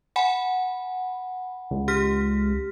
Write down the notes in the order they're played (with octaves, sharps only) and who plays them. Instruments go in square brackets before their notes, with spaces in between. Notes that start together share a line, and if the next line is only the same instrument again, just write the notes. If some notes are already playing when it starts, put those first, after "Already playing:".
[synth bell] F#5 G#5 B5
[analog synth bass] C#2
[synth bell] G4 F6 B6